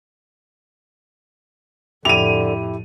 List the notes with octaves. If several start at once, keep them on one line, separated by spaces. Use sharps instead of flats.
F2 A2 D3 E4 G4 D#7 F7